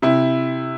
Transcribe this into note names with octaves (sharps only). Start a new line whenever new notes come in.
C3 E4